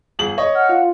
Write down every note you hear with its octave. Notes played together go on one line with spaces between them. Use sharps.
G1 G#4 F#7
C#5 D#5
F#5 F6
F4